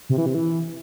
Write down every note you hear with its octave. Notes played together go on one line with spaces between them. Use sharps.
C3
E3
C3
E3